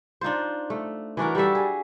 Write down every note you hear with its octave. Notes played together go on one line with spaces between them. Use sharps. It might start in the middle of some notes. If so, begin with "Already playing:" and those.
D4 D#4 F4 C5
A3
E3 D4 F#4 A#4
G3 F#4 A4 E5
G#4